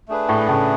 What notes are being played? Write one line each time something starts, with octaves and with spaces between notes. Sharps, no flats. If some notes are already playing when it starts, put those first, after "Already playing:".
A3 D4 G#4 B4
A2
A2 C#3